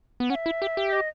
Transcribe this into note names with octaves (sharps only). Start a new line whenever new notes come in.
B3
C#4 F#5
E5
E4
G4
G4
D#5